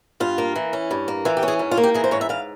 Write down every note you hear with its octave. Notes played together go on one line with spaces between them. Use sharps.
G2 F4
A#3
E3
C#4
G2
A#3
E3 F4
G4
C#4
G#4
G#2
F4
A#3
G4
E3 G#4
C5
G#2 C#5
E5
G#2 F5